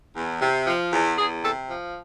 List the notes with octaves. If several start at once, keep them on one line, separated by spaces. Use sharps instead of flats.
E2
C3
F3
E2
E2 G#4
C3 A4
F3